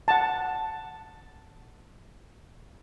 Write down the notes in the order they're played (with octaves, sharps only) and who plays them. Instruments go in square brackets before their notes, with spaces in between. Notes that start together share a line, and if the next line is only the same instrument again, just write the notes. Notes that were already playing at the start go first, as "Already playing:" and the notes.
[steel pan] F#5 A5